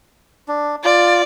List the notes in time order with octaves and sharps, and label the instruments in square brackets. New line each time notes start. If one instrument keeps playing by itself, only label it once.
[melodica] D4
[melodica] F4 [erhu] D5